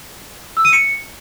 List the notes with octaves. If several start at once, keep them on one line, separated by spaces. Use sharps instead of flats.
E6
D#7
C#7